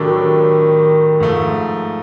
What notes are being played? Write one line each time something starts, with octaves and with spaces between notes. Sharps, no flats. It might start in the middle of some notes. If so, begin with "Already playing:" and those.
Already playing: A2 D#3 F#3 A3 D4 G4
G#2 F3 A3